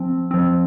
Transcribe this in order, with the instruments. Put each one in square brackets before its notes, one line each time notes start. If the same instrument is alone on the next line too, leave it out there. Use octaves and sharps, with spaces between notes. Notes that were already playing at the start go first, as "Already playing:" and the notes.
Already playing: [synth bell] F3 C4
F3 C4